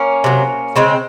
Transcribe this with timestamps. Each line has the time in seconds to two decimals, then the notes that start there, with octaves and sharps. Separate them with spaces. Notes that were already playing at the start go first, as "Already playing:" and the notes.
Already playing: A#3 C#4
0.24 C3 F#3
0.76 C#3 G#3 C4